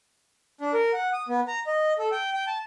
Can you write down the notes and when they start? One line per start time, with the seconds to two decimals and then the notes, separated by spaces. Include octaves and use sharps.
0.61 D4
0.73 A#4
0.93 F#5
1.13 D#6
1.28 B3
1.48 A#5
1.67 D#5
1.99 A4
2.12 G5
2.33 G5
2.47 A5